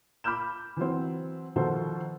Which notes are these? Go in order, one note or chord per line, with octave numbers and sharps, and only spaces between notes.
B5 D6 F6 G6 E7
E3 F#3 C4
B2 D#3 F3 F#4 A4 C5